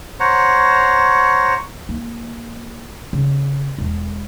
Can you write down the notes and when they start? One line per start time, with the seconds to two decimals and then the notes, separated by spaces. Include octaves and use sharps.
0.20 C5 C#5 F#5 A#5
1.89 A#3
3.13 C#3
3.78 E1